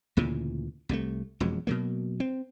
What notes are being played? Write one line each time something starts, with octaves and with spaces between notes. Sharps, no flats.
D2 A#2 C#3 E3
C2 C3 G3 A3
E1 F2 F#3 G#3
B2 F#3 A#3
C4